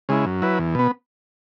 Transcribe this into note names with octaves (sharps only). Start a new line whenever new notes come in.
C#3 G#3 E4
F#2
F#3 E4 B4
E2
B2 B3